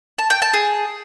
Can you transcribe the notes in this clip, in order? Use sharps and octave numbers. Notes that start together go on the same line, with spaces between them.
A5
G5
A5
G#4